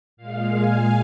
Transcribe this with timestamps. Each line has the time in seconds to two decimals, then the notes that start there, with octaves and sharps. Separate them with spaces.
0.17 A#2 G#3 F5
0.54 G#5